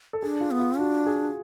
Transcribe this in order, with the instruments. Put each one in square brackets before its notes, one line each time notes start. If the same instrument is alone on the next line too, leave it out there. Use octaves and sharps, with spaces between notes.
[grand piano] A4
[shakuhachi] D4 [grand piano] G#4
[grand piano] F4
[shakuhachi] B3
[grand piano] F4
[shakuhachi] D4 [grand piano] F#4
[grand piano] G#4